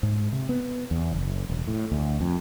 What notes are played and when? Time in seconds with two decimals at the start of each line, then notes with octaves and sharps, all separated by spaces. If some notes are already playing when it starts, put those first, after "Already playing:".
0.03 G#2
0.32 C3
0.49 B3
0.91 E2
1.12 F#1
1.49 E1
1.68 A2
1.92 D2
2.21 F2